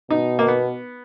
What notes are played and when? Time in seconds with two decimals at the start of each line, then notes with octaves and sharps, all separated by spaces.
0.10 B2 D#4
0.39 A#3
0.48 B3